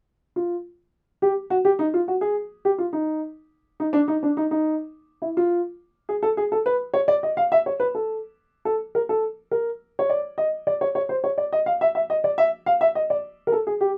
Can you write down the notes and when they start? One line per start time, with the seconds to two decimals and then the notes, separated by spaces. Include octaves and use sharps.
0.36 F4
1.22 G4
1.50 F#4
1.65 G4
1.79 D#4
1.94 F4
2.08 F#4
2.21 G#4
2.65 G4
2.78 F4
2.93 D#4
3.80 D#4
3.93 D4
4.08 D#4
4.23 D4
4.37 D#4
4.51 D#4
5.22 E4
5.37 F4
6.09 G#4
6.23 A4
6.37 G#4
6.52 A4
6.66 B4
6.94 C#5
7.08 D5
7.23 D#5
7.37 F5
7.52 E5
7.66 C#5
7.80 B4
7.95 A4
8.65 A4
8.95 A#4
9.09 A4
9.51 A#4
9.99 C#5
10.10 D5
10.38 D#5
10.67 D5
10.81 C#5
10.95 C#5
11.09 C5
11.24 C#5
11.38 D5
11.53 D#5
11.66 F5
11.81 E5
11.95 E5
12.10 D#5
12.24 D5
12.38 E5
12.66 F5
12.81 E5
12.95 D#5
13.10 D5
13.47 A#4
13.52 A4
13.67 G#4
13.81 G4